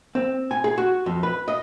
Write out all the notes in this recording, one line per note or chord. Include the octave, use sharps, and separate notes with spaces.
C4
G#5
G#4
F#4
F2
B4
D#5